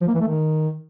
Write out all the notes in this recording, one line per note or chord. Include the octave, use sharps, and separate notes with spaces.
F3
A#3
E3
A3
D#3